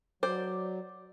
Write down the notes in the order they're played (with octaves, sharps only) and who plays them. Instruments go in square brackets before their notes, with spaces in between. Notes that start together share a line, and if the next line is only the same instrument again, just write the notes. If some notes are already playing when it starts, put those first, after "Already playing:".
[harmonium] F#3 [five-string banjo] C5 [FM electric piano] D5